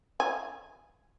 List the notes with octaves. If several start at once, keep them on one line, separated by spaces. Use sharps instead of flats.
G#5